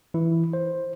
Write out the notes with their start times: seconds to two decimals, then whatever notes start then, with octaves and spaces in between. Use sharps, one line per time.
0.14 E3 E4
0.53 C5